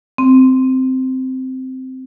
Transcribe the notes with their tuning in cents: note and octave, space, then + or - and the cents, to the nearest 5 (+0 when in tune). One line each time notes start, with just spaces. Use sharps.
C4 -10